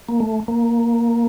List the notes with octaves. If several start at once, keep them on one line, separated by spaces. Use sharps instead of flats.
A#3
A3
A#3